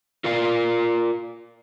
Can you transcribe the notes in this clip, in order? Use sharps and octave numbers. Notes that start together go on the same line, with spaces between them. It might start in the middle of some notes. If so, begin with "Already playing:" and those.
F4 A#4 D5 F5